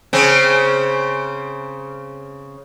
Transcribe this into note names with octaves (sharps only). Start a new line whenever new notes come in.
C#3 C4